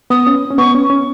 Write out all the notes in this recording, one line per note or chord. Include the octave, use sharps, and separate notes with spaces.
B3 D#6
C#4
C#4
B3 C#6
C#4
C#4